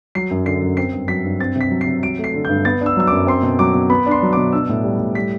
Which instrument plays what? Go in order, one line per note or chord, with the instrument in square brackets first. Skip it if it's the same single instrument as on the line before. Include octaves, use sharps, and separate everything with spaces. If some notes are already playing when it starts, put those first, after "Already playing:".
[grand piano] F#3 C7
F#2
D3 C7
F#2
C4 C7
G2
F#3 B6
G2
C4 A6
C3
B6
F#3
C7
C3
F#3 D7
A3
C7
D3
G2 G6
B3 A6
D4
E6
F#3 E6
F#2 D6
C4 C6
B2
F#3 D6
B2
B3 B5
D4
C6
F#3
B2 D6
D4 E6
A2
G3
A2
G3 B6